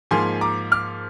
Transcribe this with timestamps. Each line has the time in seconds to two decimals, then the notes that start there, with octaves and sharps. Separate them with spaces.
0.11 G#2 F3 A#3 G#5 C6
0.41 A#5 D6
0.71 D6 F6